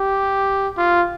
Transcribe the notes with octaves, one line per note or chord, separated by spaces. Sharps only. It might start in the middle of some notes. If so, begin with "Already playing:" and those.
Already playing: G4
F4